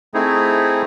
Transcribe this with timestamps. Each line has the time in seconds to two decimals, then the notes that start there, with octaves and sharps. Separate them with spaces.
0.14 A3 C4 D#4 E4 G#4